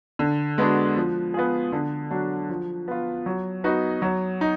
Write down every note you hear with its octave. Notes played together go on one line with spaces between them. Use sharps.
D3
G#3 B3 D4 F#4
F3
B3 F4 G#4
D3
F#3 D4 F#4
F3
B3 F4
F#3
B3 D#4 F#4
F#3
D#4